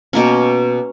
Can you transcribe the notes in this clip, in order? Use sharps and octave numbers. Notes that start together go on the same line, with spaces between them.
B2 A#3 C#4